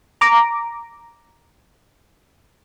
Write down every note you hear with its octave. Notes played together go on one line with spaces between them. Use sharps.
A#5 D6